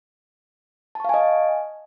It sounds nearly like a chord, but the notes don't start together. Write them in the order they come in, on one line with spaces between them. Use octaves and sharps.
A5 C#6 F5 G#5 D#5